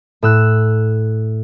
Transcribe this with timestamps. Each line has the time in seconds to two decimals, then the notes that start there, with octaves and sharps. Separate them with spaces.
0.22 A2 E6 F#6